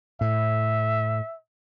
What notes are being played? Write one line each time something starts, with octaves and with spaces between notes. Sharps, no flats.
A2 E5